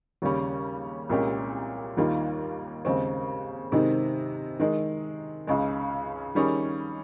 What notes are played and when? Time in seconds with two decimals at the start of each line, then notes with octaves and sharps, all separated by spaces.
0.22 D#2 C#3 G3 C#4
1.09 C2 A#2 G#3 C#4 G4
1.97 D#2 D#3 G3 A#3 F4
2.85 D#2 C#3 G#3 C4
3.72 C3 D#3 G#3 C4 D#4
4.60 D#3 G#3 D#4
5.47 C#2 C#3 G#3
6.35 D#3 G3 C#4 G#4